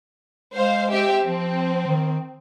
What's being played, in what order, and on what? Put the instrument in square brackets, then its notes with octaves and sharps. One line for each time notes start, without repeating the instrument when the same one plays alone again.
[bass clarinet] G#3 [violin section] C5 F5
[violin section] C4 G4 E5
[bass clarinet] F3 [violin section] C4
[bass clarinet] D#3